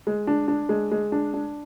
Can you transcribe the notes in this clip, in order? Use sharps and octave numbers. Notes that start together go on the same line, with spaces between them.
G#3
D4
D4
G#3
G#3
D4
D4